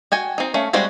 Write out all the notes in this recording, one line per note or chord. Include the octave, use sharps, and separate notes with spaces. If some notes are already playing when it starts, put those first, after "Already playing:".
F#4 G5 G#5
C4 D#4
A3 C#4 F5
G3 G#3 C4 F#4 C5